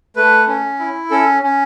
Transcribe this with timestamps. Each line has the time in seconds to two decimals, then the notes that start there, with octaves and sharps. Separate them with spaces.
0.16 A3 B4
0.48 C#4
0.79 E4
1.11 C#4 A4
1.43 C#4